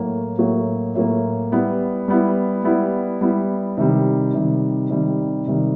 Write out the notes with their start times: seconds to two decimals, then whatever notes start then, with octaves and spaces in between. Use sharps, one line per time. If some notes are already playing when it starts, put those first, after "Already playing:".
Already playing: A2 F#3 A#3
0.39 A2 F#3 A#3
0.95 A2 F#3 A#3
1.52 G3 B3 E4
2.08 G3 B3 E4
2.64 G3 B3 E4
3.21 G3 B3 E4
3.77 C3 D#3 G3
4.34 C3 D#3 G3
4.90 C3 D#3 G3
5.47 C3 D#3 G3